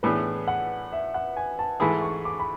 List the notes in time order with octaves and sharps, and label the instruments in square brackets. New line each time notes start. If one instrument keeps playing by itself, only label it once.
[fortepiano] A2 E3 B3 D4 G#4 [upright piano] B4
[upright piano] F#5
E5
F#5
G#5
A5
[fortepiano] G#2 E3 A3 E4 G#4 [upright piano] B5
[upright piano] C#6
D6
B5